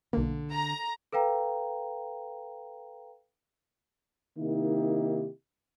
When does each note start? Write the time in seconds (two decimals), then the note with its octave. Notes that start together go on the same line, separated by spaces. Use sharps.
0.13 B1 D3 A#3
0.52 A#5
1.13 A4 B4 F5 G5 A#5
4.38 C3 D#3 A#3 D#4 E4 G4